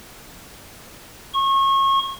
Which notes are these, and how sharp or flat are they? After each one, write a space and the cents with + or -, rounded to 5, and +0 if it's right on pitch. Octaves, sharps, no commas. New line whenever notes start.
C#6 -30